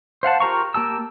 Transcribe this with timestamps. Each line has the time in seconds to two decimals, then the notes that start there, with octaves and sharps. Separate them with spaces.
0.23 C5 F5 F#5 A5
0.40 F4 G4 A#4 A#5 C#6
0.74 A#3 G4 A5 E6